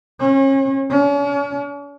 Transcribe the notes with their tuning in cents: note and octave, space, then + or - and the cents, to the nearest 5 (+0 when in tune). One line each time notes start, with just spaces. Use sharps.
C#4 -35
C#4 +40